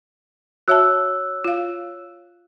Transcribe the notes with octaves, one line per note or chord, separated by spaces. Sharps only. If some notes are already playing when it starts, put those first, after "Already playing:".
F#4 C#5 E5 A5 E6 F#6
F4 F5